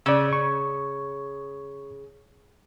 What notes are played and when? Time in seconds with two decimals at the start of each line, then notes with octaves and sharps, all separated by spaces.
0.06 C#3 D5 E6
0.33 C#6